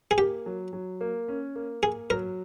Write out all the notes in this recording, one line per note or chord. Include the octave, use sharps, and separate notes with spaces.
G#4
A#3 G4
F#3
F#3
A#3
C#4
A#3
A#3 G#4
F#3 A#4